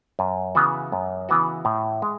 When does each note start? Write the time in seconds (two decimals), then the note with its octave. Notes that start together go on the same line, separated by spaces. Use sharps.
0.19 F#2
0.55 C#3 E3 B3 F#4
0.92 F#2
1.29 C#3 E3 B3 F#4
1.65 A2
2.02 G#3